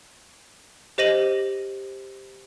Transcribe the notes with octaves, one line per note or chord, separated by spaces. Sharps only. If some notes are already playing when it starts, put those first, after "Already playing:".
G4 C5 D#5 A#6 D#7 F#7